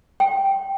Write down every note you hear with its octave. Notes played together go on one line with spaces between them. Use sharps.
G5